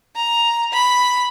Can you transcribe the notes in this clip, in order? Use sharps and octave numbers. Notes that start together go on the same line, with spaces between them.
A#5
B5